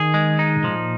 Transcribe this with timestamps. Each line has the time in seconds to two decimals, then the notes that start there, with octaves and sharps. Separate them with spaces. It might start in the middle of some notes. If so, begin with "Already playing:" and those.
Already playing: D#3 G#4
0.14 G#3
0.39 D#4
0.64 A#2 F3